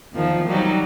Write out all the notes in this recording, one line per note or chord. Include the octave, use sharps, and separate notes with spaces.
E2 D#3 F3
F#3 G3 D#4